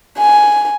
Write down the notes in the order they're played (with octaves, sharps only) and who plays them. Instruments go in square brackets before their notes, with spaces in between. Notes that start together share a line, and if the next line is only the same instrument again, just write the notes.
[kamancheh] G#5